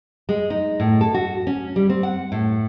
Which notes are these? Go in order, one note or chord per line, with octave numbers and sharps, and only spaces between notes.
G#3
D#4
A2
A4
F#4
C#4
G3
C4
F#5
A2